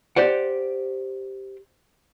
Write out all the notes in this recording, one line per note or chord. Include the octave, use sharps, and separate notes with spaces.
G4 C5 D5 F#5